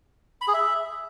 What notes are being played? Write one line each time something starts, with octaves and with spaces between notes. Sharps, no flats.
B5
G#4
E5